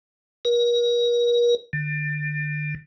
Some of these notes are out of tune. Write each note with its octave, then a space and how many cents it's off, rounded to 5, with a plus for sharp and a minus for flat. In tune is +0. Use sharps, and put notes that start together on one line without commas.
A#4 +40
D3 +30